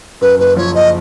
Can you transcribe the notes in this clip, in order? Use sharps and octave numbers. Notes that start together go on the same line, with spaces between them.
F#2 B4
F#1 B4
F3 C#5
F#1 D#5